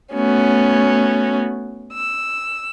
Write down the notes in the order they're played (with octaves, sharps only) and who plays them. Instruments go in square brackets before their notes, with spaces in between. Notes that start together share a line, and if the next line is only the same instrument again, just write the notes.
[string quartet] A3 B3 C#4 F#4
E6